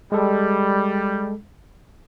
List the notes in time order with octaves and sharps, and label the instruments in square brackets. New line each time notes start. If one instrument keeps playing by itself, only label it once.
[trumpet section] G3 [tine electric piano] G#3 A4